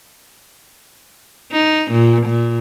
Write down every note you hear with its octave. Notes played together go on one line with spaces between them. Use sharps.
D#4
A#2
A#2